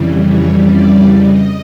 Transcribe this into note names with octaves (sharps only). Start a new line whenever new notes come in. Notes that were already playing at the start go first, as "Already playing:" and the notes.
Already playing: F2 C#3 E3 G3
C#5
D5
D#5